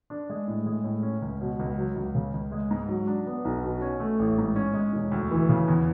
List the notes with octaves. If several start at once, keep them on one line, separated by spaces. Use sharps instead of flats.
D4
G#3
A2
G#3
A2
C#4
C#2
B2
C#2
F#3
C#2
C#3
C#2
G#3
G#2
F#3
D4
B3
B1
B2
C#4
A3
A1
G#2
C#4
G#3
E1
D2
E3
C#3
E2